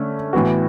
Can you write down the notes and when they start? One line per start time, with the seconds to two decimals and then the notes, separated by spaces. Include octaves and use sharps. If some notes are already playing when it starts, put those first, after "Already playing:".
Already playing: D3 A3 C#4
0.33 A2 E3 B3 F#4